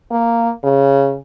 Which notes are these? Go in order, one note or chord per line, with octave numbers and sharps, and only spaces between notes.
A#3
C#3